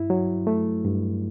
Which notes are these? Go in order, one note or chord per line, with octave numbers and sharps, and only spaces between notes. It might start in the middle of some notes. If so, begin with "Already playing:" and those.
Already playing: G2 E4
F#3
A3
G2